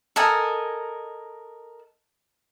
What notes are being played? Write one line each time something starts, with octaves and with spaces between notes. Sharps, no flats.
A4 A#4 D#5 G#5